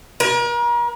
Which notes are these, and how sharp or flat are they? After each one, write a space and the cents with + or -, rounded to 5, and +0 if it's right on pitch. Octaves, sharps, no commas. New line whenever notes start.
A#4 +40